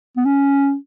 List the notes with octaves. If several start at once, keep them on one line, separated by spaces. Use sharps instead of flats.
B3
C#4